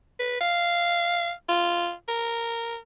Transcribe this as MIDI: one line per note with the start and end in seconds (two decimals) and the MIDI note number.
0.19 0.37 71
0.40 1.31 77
1.49 1.92 65
2.08 2.77 70